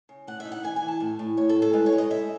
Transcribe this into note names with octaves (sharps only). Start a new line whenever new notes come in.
C#3
A2 F#5
E5
D#4
F#5
E3 G#5
G#5
E3
A5
A2
A2
A2 C#5
A4
A2
A4
G#3 B4
C#5
G#3
D#5
G#2 E5